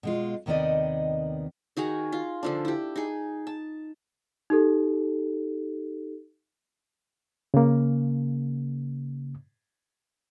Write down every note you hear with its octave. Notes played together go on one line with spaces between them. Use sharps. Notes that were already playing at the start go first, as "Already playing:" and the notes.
B2 G#3 F4
D#2 C3 D#3 B3 D5 D#5
D#3 F#4 G#4 A#5
F4
D3 F3 D4
E4 G4
D#4 G#4
A5
D#4 G4 A4
C#3 A#3